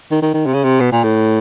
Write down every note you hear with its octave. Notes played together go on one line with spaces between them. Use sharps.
D#3
D#3
D#3
C3
C#3
C3
B2
A#2
A2